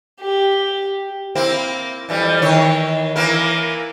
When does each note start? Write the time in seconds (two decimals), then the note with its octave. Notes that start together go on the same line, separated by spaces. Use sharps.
0.21 G4
1.35 A#3 C4 E4
2.09 F2 E3 G3
2.42 D#3 E3 C#5
3.16 E3 A#3 A#4